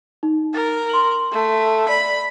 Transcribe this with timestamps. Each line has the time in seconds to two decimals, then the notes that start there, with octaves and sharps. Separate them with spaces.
0.23 D#4
0.54 A#4 A6
0.89 C6 F#7
1.32 A3
1.89 D5 B5